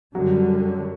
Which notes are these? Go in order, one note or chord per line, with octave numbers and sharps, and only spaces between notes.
F#2 D3 F#3 G3